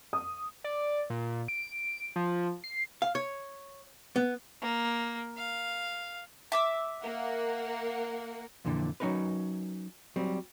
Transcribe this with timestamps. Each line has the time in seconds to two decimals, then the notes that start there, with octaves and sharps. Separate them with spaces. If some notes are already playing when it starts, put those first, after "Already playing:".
0.13 D#6
0.64 D5
1.10 A#2
1.48 D7
2.16 F3
2.64 C7
3.02 F5
3.15 C#5
4.16 B3
4.62 A#3
5.37 F5
6.52 E5 D6 E6
7.02 A#3 F#5
8.65 F2 A#2 D3 E3
9.00 F#3 C#4 D#4 A#4 B4
10.16 F#3 G3 C4